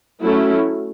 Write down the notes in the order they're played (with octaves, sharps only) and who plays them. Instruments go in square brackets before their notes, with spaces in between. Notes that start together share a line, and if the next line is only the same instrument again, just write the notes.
[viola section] F#3 A3 C#4 E4